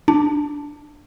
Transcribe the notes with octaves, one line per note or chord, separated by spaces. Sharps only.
D4